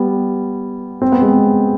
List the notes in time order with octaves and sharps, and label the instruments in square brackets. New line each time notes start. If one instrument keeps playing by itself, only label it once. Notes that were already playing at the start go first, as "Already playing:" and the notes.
Already playing: [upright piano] G3 B3
C4
B3
G#3 C4